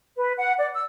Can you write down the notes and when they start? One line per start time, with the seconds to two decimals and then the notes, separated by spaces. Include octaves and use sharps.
0.16 B4
0.36 F#5
0.58 D5
0.74 E6